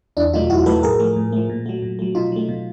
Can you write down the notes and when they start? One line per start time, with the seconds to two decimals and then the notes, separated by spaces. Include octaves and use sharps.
0.17 E2 D4 E4
0.33 B2 F#3 A3 D#4 F4
0.50 E2 E4 F#4
0.66 B2 F#3 A3 A4 B4
0.83 A2 G#4 A#4
1.00 F3 A3
1.16 A2
1.32 F3 A3
1.50 A#2
1.66 F#3 A3
1.82 A#2
1.99 F#3 A3
2.15 B2 D#4 F4
2.32 F#3 A3
2.49 B2